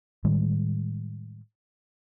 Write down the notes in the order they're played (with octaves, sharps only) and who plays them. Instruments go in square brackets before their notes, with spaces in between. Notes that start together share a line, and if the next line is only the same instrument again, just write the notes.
[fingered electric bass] A2 D#3 G3 G#3